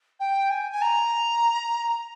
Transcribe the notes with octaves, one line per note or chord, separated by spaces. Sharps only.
G5
G#5
G#5
A#5